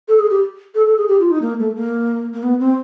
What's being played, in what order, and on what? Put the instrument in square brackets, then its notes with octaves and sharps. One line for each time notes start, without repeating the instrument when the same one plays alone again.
[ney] A4
G#4
G4
A4
A4
G#4
G4
F4
D#4
A#3
A3
A#3
A#3
B3
C4